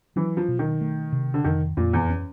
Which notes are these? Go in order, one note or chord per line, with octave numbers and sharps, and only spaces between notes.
E3 F#3
F3
B2
D#3
A3
C3
D3
F2 D#3
F2 A#2
E2
C#4